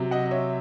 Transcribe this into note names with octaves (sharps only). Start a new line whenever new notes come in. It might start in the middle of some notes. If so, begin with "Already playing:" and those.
Already playing: C3 F#3
D#5 F#5
D#5
C#5 E5